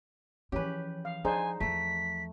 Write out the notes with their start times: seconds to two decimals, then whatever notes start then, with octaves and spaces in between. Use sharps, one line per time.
0.52 E3 F3 C#4 G4 B4
1.05 F5
1.25 F3 D4 D#4 G#4 C5 G#5
1.60 E2 F3 A3 B6